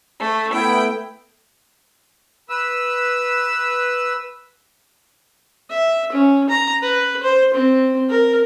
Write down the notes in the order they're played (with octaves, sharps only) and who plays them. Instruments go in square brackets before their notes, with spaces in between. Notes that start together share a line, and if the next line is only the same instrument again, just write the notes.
[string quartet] A3
[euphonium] A3 [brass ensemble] B3 E4 [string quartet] G5
[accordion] B4 E6
[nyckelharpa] E5
C#4
A#5
B4
C5
C4
A#4